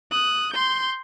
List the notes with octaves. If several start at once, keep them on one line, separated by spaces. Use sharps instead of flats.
D#6 F#6
C6 G6